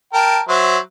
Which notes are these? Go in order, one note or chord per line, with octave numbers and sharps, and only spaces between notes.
A#4 G5 A5
F#3 C5 E5